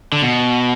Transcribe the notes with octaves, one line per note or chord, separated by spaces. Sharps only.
D3
B2